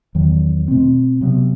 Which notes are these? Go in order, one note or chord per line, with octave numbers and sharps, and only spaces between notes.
E2 D#3 F#3
B2 A3 C4
C3 F#3 B3